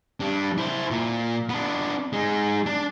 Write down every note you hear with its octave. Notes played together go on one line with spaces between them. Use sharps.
G2 D4
E4 C5
A#2
B3 D4
G#3 D#4
D4